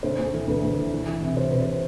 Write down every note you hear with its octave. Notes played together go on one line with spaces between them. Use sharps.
D2 C5
D2
A4
E3
D2 B4
D2
E3
E3
E3
C3
C3 C5
C3 B4
C5